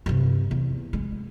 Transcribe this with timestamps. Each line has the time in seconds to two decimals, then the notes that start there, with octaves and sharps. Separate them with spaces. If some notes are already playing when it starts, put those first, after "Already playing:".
0.06 G2 C3
0.51 E2
0.93 G#3